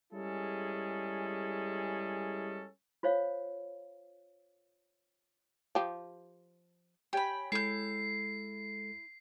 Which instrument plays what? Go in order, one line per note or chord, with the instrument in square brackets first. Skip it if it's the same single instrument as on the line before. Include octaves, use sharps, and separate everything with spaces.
[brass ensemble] G3 G#3 C#4 E4 G#4 A4
[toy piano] F4 C5 C#5 F5
[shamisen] F3 G4
[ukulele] G4 C#5 G#5 [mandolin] G5 B5
[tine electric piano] G#3 A4 [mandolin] E4 G6 [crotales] C7